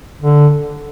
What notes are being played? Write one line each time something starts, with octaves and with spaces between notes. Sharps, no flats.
D3